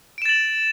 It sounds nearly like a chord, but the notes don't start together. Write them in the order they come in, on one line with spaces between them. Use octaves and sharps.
D7 E7 A6 F#7